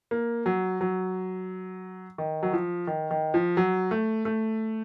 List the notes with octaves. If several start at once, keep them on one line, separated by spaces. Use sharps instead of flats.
A#3
F#3
F#3
D#3
F#3
F3
D#3
D#3
F3
F#3
A3
A3